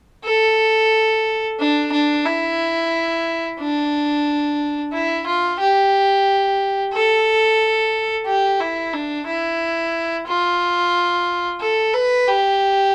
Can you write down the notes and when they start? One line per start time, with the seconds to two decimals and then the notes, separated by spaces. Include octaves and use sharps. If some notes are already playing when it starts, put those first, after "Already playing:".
0.24 A4
1.59 D4
1.92 D4
2.25 E4
3.59 D4
4.92 E4
5.26 F4
5.60 G4
6.93 A4
8.26 G4
8.60 E4
8.93 D4
9.26 E4
10.27 F4
11.61 A4
11.93 B4
12.27 G4